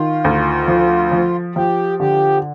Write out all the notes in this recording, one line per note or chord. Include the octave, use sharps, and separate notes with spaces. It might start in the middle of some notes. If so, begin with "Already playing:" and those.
Already playing: D#3 F4
D2
F3
F3
F3 G4
D3 G4